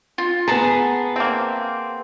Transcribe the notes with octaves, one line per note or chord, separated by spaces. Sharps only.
F4
B3 G#4 B4 A5 A#5
A#3 C4